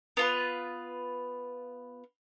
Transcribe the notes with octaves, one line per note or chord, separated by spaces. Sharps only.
B3 F4 B4